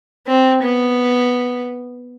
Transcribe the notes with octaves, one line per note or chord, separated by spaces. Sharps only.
C4
B3